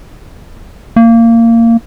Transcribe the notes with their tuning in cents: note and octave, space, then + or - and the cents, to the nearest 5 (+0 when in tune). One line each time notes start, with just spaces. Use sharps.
A#3 -20